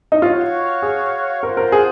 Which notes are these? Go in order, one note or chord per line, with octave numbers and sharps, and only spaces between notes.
D#4
F4 F#4 C#5 F5
G#4
F4 A#4 C5 F#5
A#4
G#4